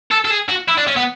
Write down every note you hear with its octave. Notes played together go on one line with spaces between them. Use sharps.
A4
A4
G#4
F#4
E4
D4
C#4
B3